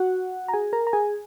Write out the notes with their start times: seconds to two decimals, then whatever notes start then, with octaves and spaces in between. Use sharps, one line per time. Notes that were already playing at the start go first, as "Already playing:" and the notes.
Already playing: F#4 F#5
0.48 A#5
0.53 G#4 G#5
0.73 A#4 A#5
0.87 A#5
0.93 G#4 G#5